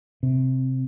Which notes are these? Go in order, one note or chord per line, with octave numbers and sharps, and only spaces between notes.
C3